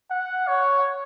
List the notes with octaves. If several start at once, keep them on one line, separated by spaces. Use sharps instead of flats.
F#5
C#5